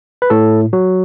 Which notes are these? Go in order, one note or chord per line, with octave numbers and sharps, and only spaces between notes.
B4
A2 A4
F#3 F#4